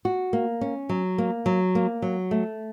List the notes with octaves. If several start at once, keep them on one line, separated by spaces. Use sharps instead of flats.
F#4
A#3
C#4
F#3
A#3
F#3
A#3
F#3
A3